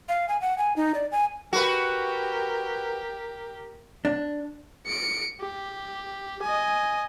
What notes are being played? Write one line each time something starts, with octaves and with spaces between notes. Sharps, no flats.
F5
G#5
F#5
G#5
D#4
D5
G#5
F#4 G4 A#4 B4
D4
C#7 D7
G4
D#5 G#5